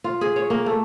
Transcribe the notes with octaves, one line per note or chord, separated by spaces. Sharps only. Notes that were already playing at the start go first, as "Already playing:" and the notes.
F4
G#4
C#5
A#3
A3